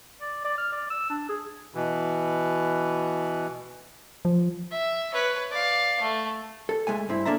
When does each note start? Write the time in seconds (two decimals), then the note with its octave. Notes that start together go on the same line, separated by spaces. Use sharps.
0.21 D5
0.45 D5
0.58 F6
0.72 D5
0.90 E6
1.10 D4
1.29 G#4
1.74 B2 E3
4.25 F3
4.72 E5
5.14 B4 C#5
5.52 D5 F5
6.01 A3
6.69 A4
6.87 C#2 G#3 A3 G#5
7.09 G2 C4 E4
7.25 C#3 A#3 D4 A4 E5 A#5